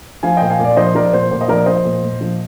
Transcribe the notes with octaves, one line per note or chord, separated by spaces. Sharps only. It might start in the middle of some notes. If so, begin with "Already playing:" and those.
F3 F5 G#5
A#2 D#5 G5
F5 G#5
A#2
D5 F5
F3 C5 D#5
F3 A#4 D5
A#2 C5
A#2 C5
D#5
F3 A#4 D5
F3 C5 D#5
A#2
A#2
F3